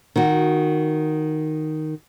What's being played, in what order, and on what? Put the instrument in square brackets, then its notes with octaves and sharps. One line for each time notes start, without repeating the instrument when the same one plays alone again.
[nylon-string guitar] D#3 F#4